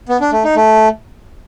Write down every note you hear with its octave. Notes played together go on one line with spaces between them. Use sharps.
B3
D4
A3
D#4
A3